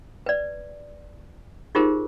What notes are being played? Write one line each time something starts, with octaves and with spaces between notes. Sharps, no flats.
B4 D5
D#4 F4 G4 G#4 A#4 C5